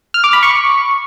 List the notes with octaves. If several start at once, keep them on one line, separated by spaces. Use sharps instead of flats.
F6
D6
B5
C#6